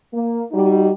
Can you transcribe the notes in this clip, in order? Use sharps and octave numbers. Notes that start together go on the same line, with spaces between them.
A#3
G3 D#4 F#4